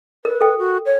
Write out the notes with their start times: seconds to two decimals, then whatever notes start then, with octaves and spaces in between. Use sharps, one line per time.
0.25 A#4 B4
0.41 A4 G5
0.59 F#4
0.86 C#5